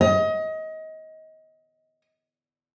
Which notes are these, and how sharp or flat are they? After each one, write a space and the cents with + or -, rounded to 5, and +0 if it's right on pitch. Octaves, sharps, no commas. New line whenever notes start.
D#5 +25